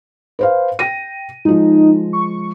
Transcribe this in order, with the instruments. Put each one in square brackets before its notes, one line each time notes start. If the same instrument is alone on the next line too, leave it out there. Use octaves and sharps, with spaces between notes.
[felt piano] B4 C5 F5
G5 A#6 D#7
[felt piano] F3 G#3 [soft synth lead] D#4
[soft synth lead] C#6